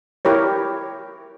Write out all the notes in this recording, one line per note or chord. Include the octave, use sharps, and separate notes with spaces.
E4 G4 A#4 C#5